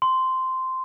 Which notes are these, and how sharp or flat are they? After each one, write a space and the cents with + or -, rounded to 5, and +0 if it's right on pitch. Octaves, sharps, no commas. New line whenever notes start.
C6 -10